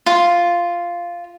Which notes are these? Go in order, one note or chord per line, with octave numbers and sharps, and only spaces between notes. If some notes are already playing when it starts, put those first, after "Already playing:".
F4